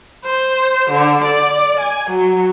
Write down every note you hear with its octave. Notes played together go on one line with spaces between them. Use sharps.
C5
D3
D5
G#5
F#3